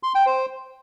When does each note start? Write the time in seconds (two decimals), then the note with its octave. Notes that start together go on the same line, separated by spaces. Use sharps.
0.03 C6
0.15 G5
0.26 C5